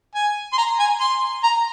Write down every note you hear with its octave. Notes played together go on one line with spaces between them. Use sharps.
G#5
C6
A#5
G#5
C6
A#5